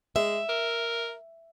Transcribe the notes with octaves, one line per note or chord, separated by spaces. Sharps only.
G#3 E5
A#4